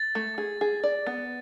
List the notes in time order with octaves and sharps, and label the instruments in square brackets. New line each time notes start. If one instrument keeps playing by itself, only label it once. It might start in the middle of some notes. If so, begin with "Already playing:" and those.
Already playing: [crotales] A6
[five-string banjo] A3
G#4
G#4
D5
B3